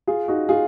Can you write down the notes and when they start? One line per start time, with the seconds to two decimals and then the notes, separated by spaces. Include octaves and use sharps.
0.07 F4 G#4
0.28 D#4 F#4
0.49 F4 G#4